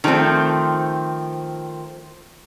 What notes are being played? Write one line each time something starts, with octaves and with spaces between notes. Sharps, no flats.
D#3 F3 G3 A3 C4